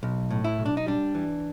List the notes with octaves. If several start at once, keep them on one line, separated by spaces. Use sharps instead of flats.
B1
A2
E4
B1
D4
D#4
G3 D4
E3